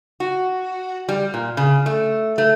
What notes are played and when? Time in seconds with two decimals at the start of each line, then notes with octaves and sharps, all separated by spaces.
0.20 F#4
1.09 G3
1.34 A#2
1.57 C#3
1.86 A3
2.38 A3